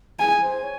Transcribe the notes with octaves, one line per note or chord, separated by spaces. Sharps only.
G#4 G#5
C5
C#5